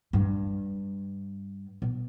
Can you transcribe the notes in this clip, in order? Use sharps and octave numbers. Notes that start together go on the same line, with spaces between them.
G2
B2